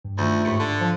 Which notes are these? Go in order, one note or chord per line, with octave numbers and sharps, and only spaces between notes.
G2
D2 D#3 A3 F4 G6
D#2 G#2 B6 C#7
D3
F3